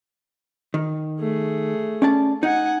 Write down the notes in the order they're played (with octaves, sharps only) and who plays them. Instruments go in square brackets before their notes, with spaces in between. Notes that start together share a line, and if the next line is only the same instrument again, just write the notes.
[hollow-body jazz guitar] D#3
[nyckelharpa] A3 G#4
[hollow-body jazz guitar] C#4 D5 A5
[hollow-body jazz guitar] D#4 [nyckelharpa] F#5 G#5